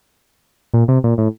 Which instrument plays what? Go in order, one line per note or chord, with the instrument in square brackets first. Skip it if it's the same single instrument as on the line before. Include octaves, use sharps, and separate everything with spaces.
[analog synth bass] A#2
C3
A#2
A2